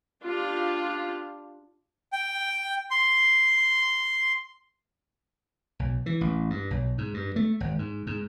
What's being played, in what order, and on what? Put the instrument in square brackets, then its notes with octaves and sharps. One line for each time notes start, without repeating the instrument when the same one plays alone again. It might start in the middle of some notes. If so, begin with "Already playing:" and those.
[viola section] D4 F4 G4
[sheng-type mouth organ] G5
C6
[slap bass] B1
E3
A1
G2
B1
G#2
G2
A3
G#1
G#2
G#2